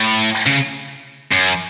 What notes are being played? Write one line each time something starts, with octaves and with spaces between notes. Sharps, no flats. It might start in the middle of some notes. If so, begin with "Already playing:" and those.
Already playing: A2
C#3
F#2